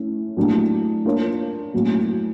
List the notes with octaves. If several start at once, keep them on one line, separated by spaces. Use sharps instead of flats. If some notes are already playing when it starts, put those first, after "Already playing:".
Already playing: A3 C#4 E4
A2 F#3 A#3 D4 G4
A#3 D4 F4 A#4 C#5
A2 F#3 A#3 C#4 F#4